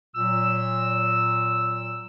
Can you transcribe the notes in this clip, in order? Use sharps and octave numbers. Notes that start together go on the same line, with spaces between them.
A#2 F#3 E6